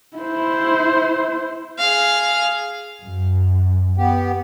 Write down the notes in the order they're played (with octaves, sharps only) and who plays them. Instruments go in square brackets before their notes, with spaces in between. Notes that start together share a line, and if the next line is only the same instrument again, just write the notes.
[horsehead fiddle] E4 C5
[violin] G#4 F5
[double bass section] F#2
[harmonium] B3 G4